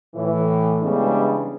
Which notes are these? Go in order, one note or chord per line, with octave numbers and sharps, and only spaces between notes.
A2 E3
C#3 E3 G3 G#3 B3 D4